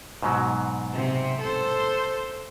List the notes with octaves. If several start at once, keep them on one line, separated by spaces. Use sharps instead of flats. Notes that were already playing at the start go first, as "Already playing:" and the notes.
G#2 B2 F#3
C3
A4 C5